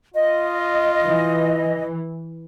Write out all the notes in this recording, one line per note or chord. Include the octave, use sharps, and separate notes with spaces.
F4 D#5
E3